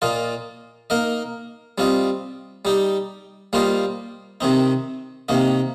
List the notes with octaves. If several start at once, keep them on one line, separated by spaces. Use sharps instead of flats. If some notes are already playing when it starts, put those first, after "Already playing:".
A#2 A#3 F4 D#5
A#3 D#4 A#4 D#5
G3 C4 F4 D#5
G3 D#4 G4
G3 A#3 F4 C5 D#5
C3 D#3 C4 D#4
C3 D#3 A#3 D#4